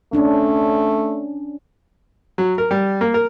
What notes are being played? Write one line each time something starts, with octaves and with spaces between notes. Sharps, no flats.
A3 C#4 D4
F#3
A#4
G3
A#3
A#4